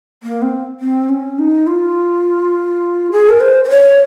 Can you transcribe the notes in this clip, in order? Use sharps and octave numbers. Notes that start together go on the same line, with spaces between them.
A#3
C4
C4
C#4
D#4
F4
G#4
A#4
C5
C5
C#5